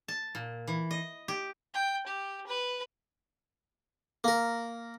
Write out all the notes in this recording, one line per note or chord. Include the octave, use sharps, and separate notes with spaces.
A5
A#2
E3
D#5
G4
G5
G4
B4
A#3 A#4